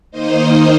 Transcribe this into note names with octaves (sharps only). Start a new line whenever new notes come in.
D#3 A#3 D#4 C5 D#5